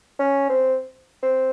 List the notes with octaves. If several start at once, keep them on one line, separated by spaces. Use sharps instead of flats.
C#4
C4
C4